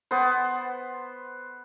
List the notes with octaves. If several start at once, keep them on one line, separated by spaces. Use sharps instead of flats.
B3 C5